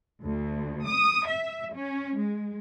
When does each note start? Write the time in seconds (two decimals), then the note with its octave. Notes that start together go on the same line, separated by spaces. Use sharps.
0.21 D2
0.86 D#6
1.27 E5
1.74 C#4
2.17 G#3